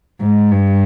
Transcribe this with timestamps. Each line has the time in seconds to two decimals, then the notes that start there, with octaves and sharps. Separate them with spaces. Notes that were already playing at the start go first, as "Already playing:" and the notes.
0.21 G#2
0.51 G2